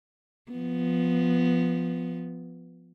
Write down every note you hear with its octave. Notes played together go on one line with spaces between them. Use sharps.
F3 B3